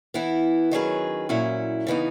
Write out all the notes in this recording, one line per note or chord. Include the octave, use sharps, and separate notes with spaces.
E3 B3 E4
D#3 F#3 C#4 G#4 B4
A#2 F#3 C#4 E4
C#3 E3 B3 D#4